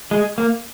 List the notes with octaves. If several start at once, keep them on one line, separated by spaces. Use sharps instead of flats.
G#3
A#3